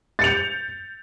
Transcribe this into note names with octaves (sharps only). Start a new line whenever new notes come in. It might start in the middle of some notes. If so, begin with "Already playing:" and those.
G6 A6 C#7 F7